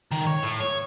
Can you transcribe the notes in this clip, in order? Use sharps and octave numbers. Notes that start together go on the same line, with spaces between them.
D#3
C#5
A2
C#5